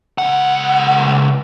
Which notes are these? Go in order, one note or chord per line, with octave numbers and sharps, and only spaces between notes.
C#2 F#5